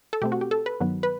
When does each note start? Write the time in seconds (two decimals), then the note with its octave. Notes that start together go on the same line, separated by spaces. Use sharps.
0.13 A4
0.22 B2 A3 C4 G4
0.32 F#4
0.41 G4
0.51 A4
0.66 B4
0.80 G2 D#3 F#3 B3
1.03 B4